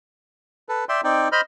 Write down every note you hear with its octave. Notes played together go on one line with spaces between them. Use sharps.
A4 B4
D5 E5 G5 C6
C4 D#4 D5 G5
C5 D#5 B5 F6